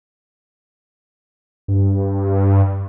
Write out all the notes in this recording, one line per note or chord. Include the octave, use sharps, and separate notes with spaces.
G2